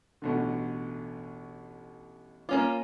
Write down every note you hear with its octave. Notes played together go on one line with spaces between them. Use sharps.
A1 B2 D3
A#3 C#4 F4 D6